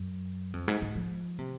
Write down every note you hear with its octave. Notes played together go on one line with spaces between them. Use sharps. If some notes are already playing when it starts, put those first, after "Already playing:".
Already playing: F#2
F2
G#2
G#2
F3
C3